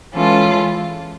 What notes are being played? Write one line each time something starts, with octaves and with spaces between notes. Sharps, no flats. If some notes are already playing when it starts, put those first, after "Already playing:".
E3 G#3 C#4 F4 A4